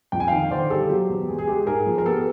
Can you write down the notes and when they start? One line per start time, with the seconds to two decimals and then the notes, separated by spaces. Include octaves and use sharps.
0.12 F2 G5
0.20 G#5
0.28 D#3 F5 G5
0.51 D3 C5 D5
0.70 G3 G4 A4
0.89 F#3 G4
1.09 E2
1.28 G#3 G#4
1.38 G#4
1.48 G#3 G4
1.67 G#2 G#4 A#4
1.86 F3
1.98 A#4
2.05 B3 G4 A4